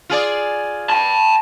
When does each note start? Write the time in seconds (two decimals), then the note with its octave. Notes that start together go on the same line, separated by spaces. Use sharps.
0.10 F4 G#4 D5
0.90 G5 A5